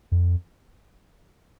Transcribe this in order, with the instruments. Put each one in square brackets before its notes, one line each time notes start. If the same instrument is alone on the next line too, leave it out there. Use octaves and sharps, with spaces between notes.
[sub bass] F2